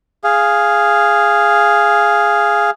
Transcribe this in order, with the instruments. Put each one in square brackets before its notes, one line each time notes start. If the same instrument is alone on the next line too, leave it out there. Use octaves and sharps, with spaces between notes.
[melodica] G#4 F5